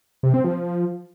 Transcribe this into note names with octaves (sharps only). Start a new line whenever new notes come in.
C3
C4
F3